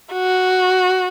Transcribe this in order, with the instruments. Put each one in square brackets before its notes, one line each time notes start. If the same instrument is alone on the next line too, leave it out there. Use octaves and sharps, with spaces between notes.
[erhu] F#4